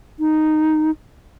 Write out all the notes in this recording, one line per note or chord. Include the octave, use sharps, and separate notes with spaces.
D#4